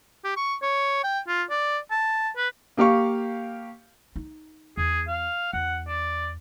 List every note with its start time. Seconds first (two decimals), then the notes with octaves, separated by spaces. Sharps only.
0.24 G4
0.37 C#6
0.62 C#5
1.04 G5
1.28 F4
1.50 D5
1.91 A5
2.37 B4
2.77 A#3 G4 F5 C#6
4.16 D#4
4.77 E2 G#4
5.08 F5
5.53 E2 F#5
5.88 D5